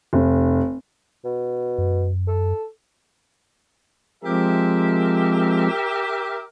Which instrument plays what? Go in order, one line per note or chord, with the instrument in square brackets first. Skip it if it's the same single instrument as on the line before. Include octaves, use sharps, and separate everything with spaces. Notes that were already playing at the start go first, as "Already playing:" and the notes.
[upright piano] F1
[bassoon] B2
[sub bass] F#2
[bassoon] A4
[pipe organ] F3 G#3 C4 [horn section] G4 A#4 E5